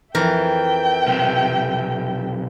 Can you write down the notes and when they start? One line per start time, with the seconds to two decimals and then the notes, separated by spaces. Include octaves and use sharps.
0.15 F2 E3 A#4 E5 G5
1.07 B1 C3